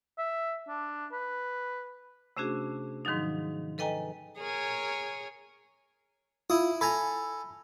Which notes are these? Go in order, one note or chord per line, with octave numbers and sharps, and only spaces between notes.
E5
D4
B4
C3 A3 C#4 D4 F#4 G#4
G#2 D#3 F3 F#3 D#4
A4 B4 D#5 G5 G#5 A#5
G#4 A#4 C#5
E4 F4 D#6
A4 G#5 A#5 B5